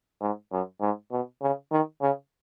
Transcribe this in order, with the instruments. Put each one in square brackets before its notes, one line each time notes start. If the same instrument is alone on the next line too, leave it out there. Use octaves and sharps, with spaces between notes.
[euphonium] G#2
F#2
G#2
B2
C#3
D#3
C#3